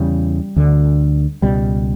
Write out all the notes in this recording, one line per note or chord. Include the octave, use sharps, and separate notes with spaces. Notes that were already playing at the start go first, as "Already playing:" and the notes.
Already playing: E2 C#3 G3
D2 D3
C#2 B2 G3